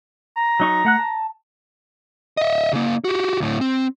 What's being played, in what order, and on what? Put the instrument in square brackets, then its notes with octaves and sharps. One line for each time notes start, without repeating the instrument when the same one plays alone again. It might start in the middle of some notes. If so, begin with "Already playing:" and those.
[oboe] A#5
[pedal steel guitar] F#3 D#4 C#6
A3 F#5 F#6
A5
[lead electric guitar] D#5 E5
C#3 A#3
F#4 G4
D2 A2
C4